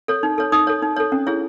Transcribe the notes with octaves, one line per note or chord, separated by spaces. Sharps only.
A4 C#5
D#4
A4 C#5
D#4 D#6
A4 C#5
D#4
A4 C#5
C#4
E4 G#4 C#5